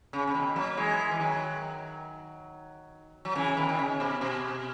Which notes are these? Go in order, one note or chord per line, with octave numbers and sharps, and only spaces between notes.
C#3
C#3
B2 D#3
F#3 A#3
E3 G#3
E3
D#3 F#3
F#3
C#3 E3
B2 D#3
D#3
C#3
B2
B2